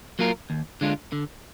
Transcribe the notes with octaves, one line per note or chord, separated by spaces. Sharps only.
F#3 A#3 F4 A#4
D#2
D3 G#3 D4 F4
D3